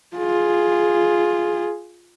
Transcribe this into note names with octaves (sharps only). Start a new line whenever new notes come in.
F4 G#4